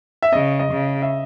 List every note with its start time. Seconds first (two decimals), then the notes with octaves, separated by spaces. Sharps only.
0.22 E5
0.33 C#3 D#5
0.59 D#5
0.72 C#3
1.02 E5